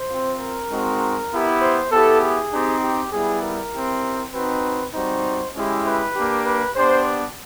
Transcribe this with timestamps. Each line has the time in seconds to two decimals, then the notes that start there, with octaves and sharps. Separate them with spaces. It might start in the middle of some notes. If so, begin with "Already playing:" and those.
Already playing: C5
0.10 C4 F4
0.40 A#4
0.71 G#3 C4 D#4 F#4
1.31 B3 E4 G4
1.61 C5
1.92 B3 E4 G4 A4
2.22 G#4
2.52 C4 D#4 G4
2.83 G4
3.13 G3 B3 E4 G#4
3.43 A#4
3.73 C4 E4 G4
4.33 C4 D#4 F#4 B4
4.94 G3 C4 D#4 F#4 C5
5.55 G#3 C#4 E4 G4
5.85 B4
6.15 A#3 D4 G4
6.45 B4
6.76 B3 D4 G4 C5